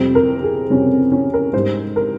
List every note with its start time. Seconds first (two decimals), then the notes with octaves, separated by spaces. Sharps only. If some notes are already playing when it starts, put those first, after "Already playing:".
Already playing: F2 C3 G3 C5
0.15 A#4
0.43 G#4
0.70 F2 C3 G3 C#4
0.92 C4
1.12 C#4
1.34 A#4
1.53 G#2 G3 C5
1.96 A#4